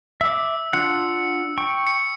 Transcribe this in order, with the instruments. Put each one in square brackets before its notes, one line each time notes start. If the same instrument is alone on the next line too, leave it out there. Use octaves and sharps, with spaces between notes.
[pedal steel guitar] E5 D6 [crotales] E6
[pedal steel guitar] D4 F4 F#5 [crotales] C#7
[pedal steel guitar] G5 C#6
[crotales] C#7